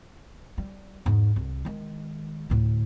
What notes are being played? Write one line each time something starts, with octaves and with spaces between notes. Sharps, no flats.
G3
E2 G#2
C2
D#3 G#3
D2 A2